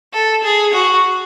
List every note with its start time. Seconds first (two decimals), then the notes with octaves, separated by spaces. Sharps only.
0.13 A4
0.43 G#4
0.74 F#4